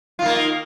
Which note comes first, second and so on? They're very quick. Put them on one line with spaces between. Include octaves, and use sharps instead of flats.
F4 D#3 A#3